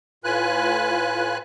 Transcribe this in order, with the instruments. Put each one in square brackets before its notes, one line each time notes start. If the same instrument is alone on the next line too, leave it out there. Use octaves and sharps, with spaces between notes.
[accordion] A2 F4 B4 G#5 F#6